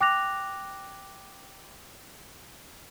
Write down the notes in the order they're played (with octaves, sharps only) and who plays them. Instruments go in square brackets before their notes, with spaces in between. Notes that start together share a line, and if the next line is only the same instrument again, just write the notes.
[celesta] G5 D6 F#6 A#6 F7